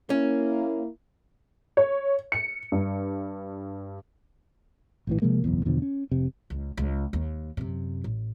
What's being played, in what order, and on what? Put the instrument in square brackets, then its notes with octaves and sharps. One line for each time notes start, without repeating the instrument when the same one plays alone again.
[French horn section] A#3 E4 [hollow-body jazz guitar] C#4
[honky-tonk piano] C#5
C#7
G2
[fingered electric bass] A#1 A2 E3
C3 F3 G#3 A#3
F#1 B1 E2
E2 B2 D3 F3
C#4
F1 C3
[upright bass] C#2
C#2
D#2
F#2 C3
A1